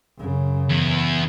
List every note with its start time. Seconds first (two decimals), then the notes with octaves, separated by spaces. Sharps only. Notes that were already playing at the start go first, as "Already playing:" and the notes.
0.18 F#2 C#3
0.69 E2